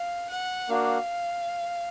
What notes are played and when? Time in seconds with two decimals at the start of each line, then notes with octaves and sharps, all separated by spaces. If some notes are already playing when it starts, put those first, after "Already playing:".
Already playing: F5
0.30 F#5
0.69 A#3 D4 F#4 F5